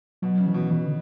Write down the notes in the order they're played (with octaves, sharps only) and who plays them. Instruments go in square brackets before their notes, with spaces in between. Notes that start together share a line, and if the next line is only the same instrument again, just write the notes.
[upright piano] B2 [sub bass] F#3
[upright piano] C#3
[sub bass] E3
[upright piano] B2
[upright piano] B2 [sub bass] E3
[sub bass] D3